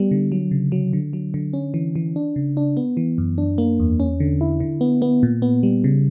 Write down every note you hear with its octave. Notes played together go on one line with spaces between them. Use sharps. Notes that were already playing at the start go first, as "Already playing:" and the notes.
Already playing: G3 B3
D3
F#3
C#3
F#3
D3
F#3
D3
C#4
E3
E3
D4
C#3
D4
B3
E3
F#2
D4
A#3
E2
C#4
D3
E4
D3
B3
B3
A#2
B3
G3
C#3